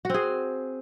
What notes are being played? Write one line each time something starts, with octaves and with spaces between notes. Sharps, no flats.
C4 F#4 G#4